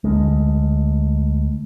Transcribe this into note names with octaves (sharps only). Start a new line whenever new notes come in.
D2 G#3